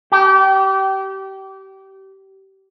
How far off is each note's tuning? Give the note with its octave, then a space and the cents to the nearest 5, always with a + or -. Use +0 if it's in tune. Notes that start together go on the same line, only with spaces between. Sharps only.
G4 -25